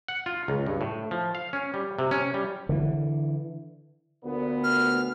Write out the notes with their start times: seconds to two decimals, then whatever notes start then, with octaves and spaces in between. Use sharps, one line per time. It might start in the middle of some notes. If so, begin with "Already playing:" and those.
0.08 F#5
0.26 F4
0.48 C#2
0.66 G2
0.81 A2
1.11 F3
1.35 F5
1.53 C#4
1.74 G3
1.99 C3
2.11 C#4
2.34 G3
2.69 D3 E3
4.24 D2 A#2 B3
4.64 F6